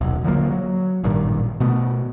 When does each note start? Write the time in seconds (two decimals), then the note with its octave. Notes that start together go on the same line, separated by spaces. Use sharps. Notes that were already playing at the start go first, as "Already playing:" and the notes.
0.01 D#1 B1
0.24 D3 F3 F#3 A#3
0.50 F#3
1.04 A1 G2 A#2 D#3
1.60 B2 A3 B3